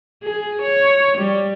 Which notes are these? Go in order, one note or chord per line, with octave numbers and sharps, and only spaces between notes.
G#4
C#5
G3